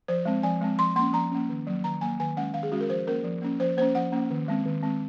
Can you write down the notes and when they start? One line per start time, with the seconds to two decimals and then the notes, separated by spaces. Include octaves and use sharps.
0.08 F3 C5
0.25 G#3 C4
0.43 F3 G#5
0.61 G#3 C4
0.79 F3 C6
0.96 A#3 C6
1.00 C#4
1.13 F3 A#5
1.31 A#3 C#4
1.49 D#3
1.67 F#3 A#3
1.84 D#3 A#5
2.01 F#3 A#3 G#5
2.20 D#3 G#5
2.37 G#3 C#4 F#5
2.54 D#3 F5
2.63 G#4
2.72 G#3 C#4 F#4
2.80 A#4
2.89 F3 C5
3.07 A#3 C#4 A#4
3.24 F3
3.42 A#3 C#4
3.60 F3 C5
3.77 A#3 C5
3.81 C#4
3.95 F3 F#5
4.12 A#3 C#4
4.30 D#3
4.48 G#3 C4
4.66 D#3
4.83 G#3 C4